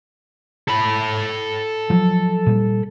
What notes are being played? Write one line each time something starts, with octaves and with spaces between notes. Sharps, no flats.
A4 B5
F3 F#3
A#2 G3